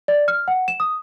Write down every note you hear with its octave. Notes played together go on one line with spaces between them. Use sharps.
D5
F6
F#5
E7
D#6